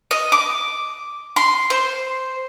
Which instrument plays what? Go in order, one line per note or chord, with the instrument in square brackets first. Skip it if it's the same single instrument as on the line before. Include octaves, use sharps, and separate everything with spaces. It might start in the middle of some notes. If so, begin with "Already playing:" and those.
[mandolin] D#5
D6
C6
C5